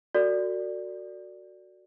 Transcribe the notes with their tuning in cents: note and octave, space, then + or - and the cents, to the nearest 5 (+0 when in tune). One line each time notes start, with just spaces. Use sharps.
F#4 +0 A4 +45 D5 +0